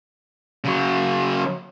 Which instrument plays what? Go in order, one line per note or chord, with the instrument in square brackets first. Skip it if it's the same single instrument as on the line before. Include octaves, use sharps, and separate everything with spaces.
[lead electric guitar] C#3 F#3